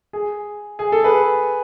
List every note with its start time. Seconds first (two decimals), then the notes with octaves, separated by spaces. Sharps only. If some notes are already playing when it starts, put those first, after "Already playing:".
0.13 G#4
0.79 G#4
0.92 A4
1.04 G#4 B4